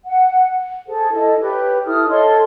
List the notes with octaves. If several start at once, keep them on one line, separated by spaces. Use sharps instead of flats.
F#5
G#4 A4 C5
E4 A4 D#5
G4 B4 C#5
E4 A4 D#6 F6
A4 C#5 D#5 C6